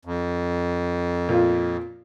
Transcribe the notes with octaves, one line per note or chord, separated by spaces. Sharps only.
F2
A#2 F4